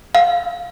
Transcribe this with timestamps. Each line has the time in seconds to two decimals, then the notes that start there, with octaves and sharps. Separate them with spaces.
0.15 F5